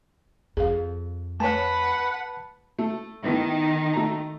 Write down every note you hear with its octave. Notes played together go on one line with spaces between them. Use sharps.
F2 G#4 F5
A3 B4 C#5 F#5 A5 B5
A3
D#3 A3 B3 E4
A3 A#5